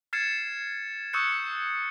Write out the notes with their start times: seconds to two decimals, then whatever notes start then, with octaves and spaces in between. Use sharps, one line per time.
0.13 F6 G#6 A6 C7 C#7 E7
1.13 C#6 D#6 E6 F#6 G6 C#7